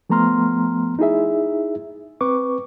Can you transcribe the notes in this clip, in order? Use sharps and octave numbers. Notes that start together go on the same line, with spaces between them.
F3 A3 B3 A#5 C6 F6
D#4 E4 G#4 E5
C4 B4 C#6 D6